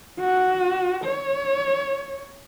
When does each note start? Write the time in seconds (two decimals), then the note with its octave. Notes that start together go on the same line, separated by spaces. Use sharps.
0.20 F#4
1.05 C#5